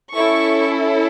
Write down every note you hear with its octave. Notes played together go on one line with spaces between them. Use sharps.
C#4 E4 A4 C#6